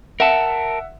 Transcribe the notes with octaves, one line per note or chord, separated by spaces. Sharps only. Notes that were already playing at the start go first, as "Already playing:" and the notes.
A#4 E5 F#5 A5